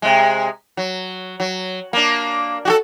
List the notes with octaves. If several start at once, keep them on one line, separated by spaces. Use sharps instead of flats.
C3 G#3
F#3
F#3
A#3 D4
F#4 G4 A4